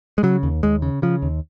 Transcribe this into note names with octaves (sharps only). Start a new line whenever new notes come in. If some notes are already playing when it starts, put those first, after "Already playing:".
G#3
C#3 F#3
D#2
D#2 G#3
C#3
C#3 F3
D#2